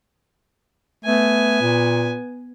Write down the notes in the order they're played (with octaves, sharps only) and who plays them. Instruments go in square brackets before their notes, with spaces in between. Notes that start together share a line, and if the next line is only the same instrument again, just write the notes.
[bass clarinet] A3 [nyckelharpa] B3 G#5
[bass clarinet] A#2